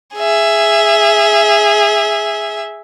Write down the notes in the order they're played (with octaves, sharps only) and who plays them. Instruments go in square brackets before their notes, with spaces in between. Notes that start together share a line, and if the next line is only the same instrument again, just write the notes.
[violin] G#4 E5